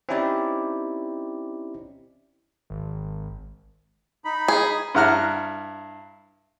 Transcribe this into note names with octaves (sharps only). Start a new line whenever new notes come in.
C4 C#4 D#4 E4 G4 D5
G#1
D#4 B5
G#4
G2 E4 F#5 A#5 F6